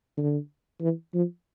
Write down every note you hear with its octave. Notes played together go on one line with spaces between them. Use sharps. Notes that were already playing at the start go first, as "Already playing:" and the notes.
D3
E3
F3